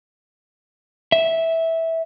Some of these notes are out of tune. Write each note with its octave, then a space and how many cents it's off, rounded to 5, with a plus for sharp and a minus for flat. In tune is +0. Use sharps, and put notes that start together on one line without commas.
E5 -10